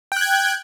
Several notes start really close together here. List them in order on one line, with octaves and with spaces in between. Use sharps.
G5 F#6 G#6